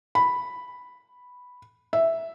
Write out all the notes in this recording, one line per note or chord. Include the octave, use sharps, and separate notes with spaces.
B5
E5